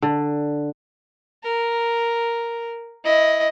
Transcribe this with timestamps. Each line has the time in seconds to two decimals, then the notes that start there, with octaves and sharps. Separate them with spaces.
0.02 D3
1.44 A#4
3.04 E4 D#5